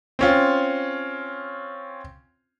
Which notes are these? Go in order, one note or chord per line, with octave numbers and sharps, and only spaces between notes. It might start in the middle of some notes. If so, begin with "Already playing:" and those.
C4 C#4 F4